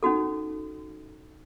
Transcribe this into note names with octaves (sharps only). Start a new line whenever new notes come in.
C#4 D#4 F#4 A4